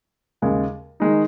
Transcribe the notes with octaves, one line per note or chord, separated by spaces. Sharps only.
D#2 C#3 G#3
D#3 G#3 D#4